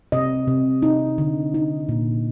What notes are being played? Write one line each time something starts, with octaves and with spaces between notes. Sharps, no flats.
C3 D#5
C3
D#4
D3
D#4
A#2